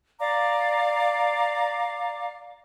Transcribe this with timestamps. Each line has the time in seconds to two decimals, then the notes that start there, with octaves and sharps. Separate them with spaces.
0.19 D5 F5 A#5 D6